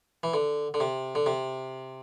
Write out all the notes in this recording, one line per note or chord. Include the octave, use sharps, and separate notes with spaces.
E3
D3
D3
C3
D3
C3